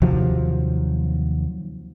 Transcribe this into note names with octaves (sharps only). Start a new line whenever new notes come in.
D#2 C3 F3 F#3